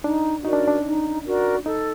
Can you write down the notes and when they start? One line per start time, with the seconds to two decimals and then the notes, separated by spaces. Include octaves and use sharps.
0.04 D4 D#4
0.44 D#4 F#4 A#4 D5
0.53 D4
0.60 C#4
0.68 D4
0.86 D#4
1.26 F#4 A#4 D5
1.66 D#4 A4